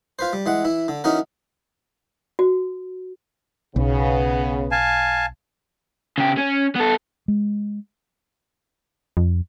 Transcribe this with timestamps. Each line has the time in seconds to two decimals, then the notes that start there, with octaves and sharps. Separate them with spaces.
0.19 F4 B4 C5
0.33 G3
0.46 E3 G#3 F#5
0.64 E3 E4
0.88 D3
1.04 E3 C#4 D#4 F#4 A#4
2.39 F#4
3.76 B1 C#3 B3
4.71 F5 G#5 A5
6.18 C#3 G4
6.38 C#4
6.76 B3 A4
7.28 G#3
9.17 F2